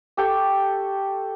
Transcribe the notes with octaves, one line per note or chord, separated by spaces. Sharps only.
G4 A4 G5 C#6